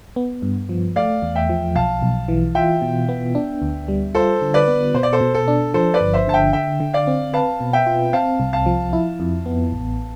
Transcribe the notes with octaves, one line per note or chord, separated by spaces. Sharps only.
B3
G2
F3
A3 D5 F5
E2
E5 G5
F3
B1 F5 A5
B1
E3
F4 E5 G5
B2
B3
D4
D2
G3
F4 A4 C5
D3
B4 D5
B3
B2 C5
D5
A4 C5
B2
A4
D4
F3 A4 C5
B4 D5
G1
C5 E5
D3 A5
E5 G5
D3 E5 G5
D3
D5 F5
C4
B4 F5 A5
B2
E5 G5
F4
C4 F5 A5
C2
F5 A5
F3
E4
F2
B3
A1